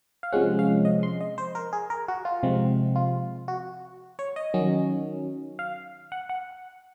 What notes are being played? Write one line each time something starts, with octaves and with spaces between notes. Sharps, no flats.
F5
C3 F3 G#3 C#4 F#5
F5
D#5
C6
D#5
C5
A#4
G#4
A#4
F#4
F4
C3 F3 G#3 C4
F4
F#4
C#5
D#5
D#3 F#3 C#4
F5
F#5
F#5